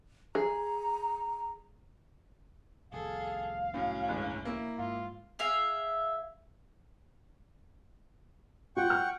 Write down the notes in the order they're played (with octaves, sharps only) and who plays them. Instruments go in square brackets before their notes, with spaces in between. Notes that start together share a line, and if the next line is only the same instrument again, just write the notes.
[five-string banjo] G#4 [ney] A#5
[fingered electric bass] C2 F2 [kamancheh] G#4 A4 [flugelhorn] F5
[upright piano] A2 F#3 [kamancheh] C#4
[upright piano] G1 A2 G#3
A#3 E4
[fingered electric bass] G#2 [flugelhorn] F4
[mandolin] G#4 E5 F5
[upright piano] F4 [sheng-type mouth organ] F#5 G5 C#6
[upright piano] F6